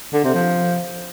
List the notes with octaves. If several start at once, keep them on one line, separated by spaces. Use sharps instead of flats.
D3
C3
F3